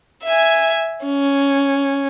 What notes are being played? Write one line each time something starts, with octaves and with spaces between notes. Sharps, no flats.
E5 G#5
C#4